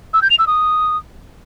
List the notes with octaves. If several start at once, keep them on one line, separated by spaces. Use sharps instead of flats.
E6
G6
F7
E6
D#6